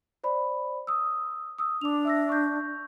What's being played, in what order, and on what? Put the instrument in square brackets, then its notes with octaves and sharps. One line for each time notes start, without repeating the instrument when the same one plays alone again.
[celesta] C5 D5 B5
D#6 E6
D#6 E6
[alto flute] D4 [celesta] D6 F7
[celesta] E5 E6 A#6
C#6 G6